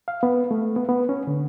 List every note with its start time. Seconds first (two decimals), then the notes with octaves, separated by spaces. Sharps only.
0.08 F5
0.23 B3
0.51 A3
0.76 B3
0.89 B3
1.09 C#4
1.27 D3